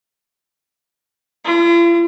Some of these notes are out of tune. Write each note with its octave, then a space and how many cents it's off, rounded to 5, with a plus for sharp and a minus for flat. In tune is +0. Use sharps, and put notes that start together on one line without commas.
F4 -45